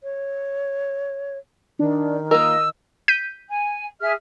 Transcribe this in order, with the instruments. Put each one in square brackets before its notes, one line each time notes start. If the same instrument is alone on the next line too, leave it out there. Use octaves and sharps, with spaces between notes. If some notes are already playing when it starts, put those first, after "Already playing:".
[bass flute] C#5
[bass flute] D#3 [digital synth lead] D4
[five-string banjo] A#3 F4 A#4 [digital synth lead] D#5 [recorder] E6
[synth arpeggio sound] G6 B6 D#7
[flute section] G#5
G#4 E5 F6